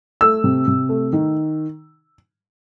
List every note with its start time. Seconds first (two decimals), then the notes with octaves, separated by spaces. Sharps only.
0.21 A3 E6
0.44 C3
0.67 C3
0.89 A3
1.13 D#3